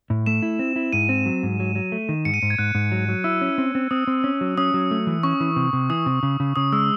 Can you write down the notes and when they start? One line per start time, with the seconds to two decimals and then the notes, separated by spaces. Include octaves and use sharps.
0.10 A2
0.26 A3 E7
0.42 E4
0.59 C4
0.76 E4
0.93 G#2 D#7
1.09 C4
1.26 F#3
1.43 G#2
1.60 F#3
1.75 F#3
1.92 A3
2.09 D#3
2.25 G#2 C#7
2.34 D#7
2.42 G#2 C#7
2.50 G#6
2.58 G#2 F#6
2.75 G#2
2.92 F#3
3.08 F#3
3.24 E4 E6
3.41 C#4
3.58 C4
3.75 C4
3.91 C4 D#6
4.07 C4
4.24 C#4
4.41 F#3
4.58 C#4 D#6
4.74 F#3
4.91 A3
5.07 E3
5.23 C#4 C#6
5.40 E3
5.56 C3
5.73 C3
5.90 E3 D#6
6.06 C3
6.23 C#3
6.40 C#3
6.56 C#3 D#6
6.72 G#3 E6